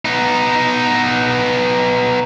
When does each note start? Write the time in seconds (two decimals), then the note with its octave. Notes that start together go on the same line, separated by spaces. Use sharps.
0.05 B3 D#4